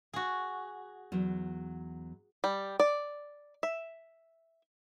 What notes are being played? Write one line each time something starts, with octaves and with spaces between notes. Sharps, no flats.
F#4 G#4
E2 F#3
G3
D5
E5